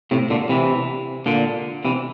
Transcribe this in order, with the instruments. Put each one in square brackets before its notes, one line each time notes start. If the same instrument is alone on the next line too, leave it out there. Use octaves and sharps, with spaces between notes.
[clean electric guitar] A2 C3
A#2 D3
C3 E3
A#2 D3
C3 E3